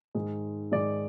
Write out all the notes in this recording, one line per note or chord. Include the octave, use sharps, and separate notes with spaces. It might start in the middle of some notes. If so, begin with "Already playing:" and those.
G#2 D#3 G#3
G#2 D#3 G#3 D5